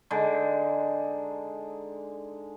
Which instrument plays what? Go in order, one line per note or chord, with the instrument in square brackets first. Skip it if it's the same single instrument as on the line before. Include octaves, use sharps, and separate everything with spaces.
[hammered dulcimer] D3 G#3 D#4